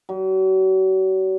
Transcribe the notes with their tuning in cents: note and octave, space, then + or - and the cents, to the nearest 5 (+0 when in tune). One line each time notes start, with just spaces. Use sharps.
F#3 +40